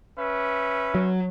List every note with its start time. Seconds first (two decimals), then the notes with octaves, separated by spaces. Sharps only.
0.19 C#4 B4 E5
0.95 F#3